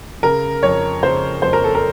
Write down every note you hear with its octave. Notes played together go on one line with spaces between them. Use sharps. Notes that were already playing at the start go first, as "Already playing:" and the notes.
C#3 A#4
F2 C#5
C#3 C5
F2 C5
A#4
A4
A#4